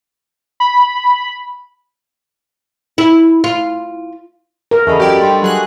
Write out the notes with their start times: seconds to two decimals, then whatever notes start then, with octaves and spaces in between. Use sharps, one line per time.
0.60 B5
2.98 E4
3.44 F4
4.71 A#4
4.87 E2 C#3 A3 D#5 B5
5.00 F#2 G4 D5
5.22 G2 C6
5.42 F#3 G#4 F#6